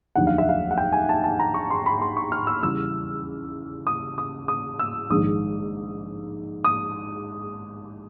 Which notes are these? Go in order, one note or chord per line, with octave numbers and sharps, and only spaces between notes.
F1 D#2 D3 F#3 F#5
F5
E5
F5
F#5
G5
G#5
A5
A5
A#5
C#6
C6
B5
C6
C#6
F6
E6
E2 C#3 E3 G3 E6
D#6
D#6
D#6
E6
A#1 G#2 D#3 D#6
D#6